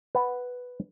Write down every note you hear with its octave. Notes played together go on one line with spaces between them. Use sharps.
B4 F#5